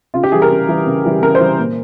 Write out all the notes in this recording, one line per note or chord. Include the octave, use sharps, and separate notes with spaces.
C#3 F4
G4
E3 G3 G#4
A#4
C#3
E3 G3
C#3
E3 G3
C#3 A#4
C5
E3 G3
A#2